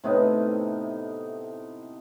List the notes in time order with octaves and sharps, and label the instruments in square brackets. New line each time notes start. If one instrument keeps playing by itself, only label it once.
[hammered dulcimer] A2 C3 B3 D#4